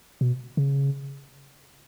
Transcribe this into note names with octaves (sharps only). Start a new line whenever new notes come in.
B2
C#3